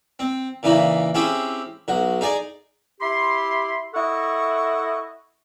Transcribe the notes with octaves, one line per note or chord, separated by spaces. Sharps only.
C4
A#2 C#3 E3 D#4 E4
C4 C#4 E4 G4 G#4 C5
B1 F#4
D#4 G#4 D5 G#5
E4 G4 B5 C6
E4 A4 D#5 F#5 C#6